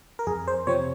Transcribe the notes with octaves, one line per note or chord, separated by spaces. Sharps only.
A#4
F2 G#4
C5
C3 F3 C4 C#5